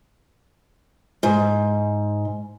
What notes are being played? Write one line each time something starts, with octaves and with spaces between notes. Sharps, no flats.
G#2